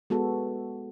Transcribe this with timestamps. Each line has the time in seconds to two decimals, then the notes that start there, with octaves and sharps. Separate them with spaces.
0.10 G#3 B3 F#4 A4